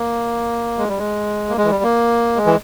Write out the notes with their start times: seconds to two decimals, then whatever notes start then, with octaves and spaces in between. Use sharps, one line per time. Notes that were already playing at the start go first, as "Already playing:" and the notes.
Already playing: A#3
0.78 G#3
0.88 G3
0.98 G#3
1.49 A#3
1.57 G#3
1.65 E3
1.70 G3
1.83 A#3
2.36 G#3
2.46 E3